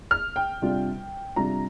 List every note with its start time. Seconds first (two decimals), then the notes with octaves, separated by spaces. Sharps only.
0.11 F6
0.36 G5
0.62 C3 G3 D4 F4
1.36 C3 G3 D4 F4 A#5